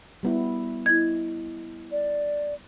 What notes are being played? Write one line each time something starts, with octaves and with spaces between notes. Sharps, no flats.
G3 B3 E4
E4 D#5 G#6
D5